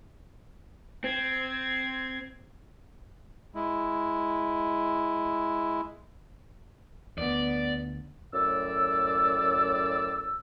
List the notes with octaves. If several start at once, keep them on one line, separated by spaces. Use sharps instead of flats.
C4 G#6
G#3 E4
D2 B3 D5
F#2 A2 D5 E6